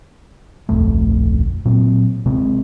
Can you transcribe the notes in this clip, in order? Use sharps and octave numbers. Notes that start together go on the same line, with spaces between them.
D1 A#1 F2 A3
A#2 F#3 C4
C3 G#3 C4